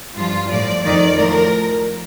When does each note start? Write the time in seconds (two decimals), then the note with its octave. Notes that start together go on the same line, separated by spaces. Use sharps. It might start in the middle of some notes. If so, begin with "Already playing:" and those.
0.16 G2 F3 F4
0.50 A2 F3 D5
0.84 F2 D#3 D5
1.18 A2 F3 A#4